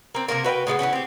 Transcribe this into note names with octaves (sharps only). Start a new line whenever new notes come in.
A#3 C4
C3 G#3 A#3 A#4
F#4 B4 E5 G5
A2 G#3 A3 B3
E3 G3 B3 C#4
C4 G4